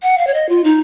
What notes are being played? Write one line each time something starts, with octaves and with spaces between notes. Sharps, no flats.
F#5
F5
C#5
D#5
F4
D#4